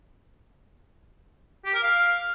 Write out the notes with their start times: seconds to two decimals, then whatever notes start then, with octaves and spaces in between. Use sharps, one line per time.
1.65 G4
1.74 A#4
1.83 F5